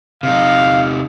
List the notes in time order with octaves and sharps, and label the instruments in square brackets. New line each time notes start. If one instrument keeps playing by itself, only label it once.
[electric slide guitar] C3 D#4 [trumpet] F5